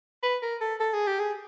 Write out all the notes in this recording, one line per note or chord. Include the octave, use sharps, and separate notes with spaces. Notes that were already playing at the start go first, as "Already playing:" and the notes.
B4
A#4
A4
A4
G#4
G4
G#4